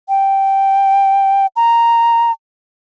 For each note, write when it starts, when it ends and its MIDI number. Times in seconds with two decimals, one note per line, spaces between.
0.09 1.46 79
1.56 2.31 82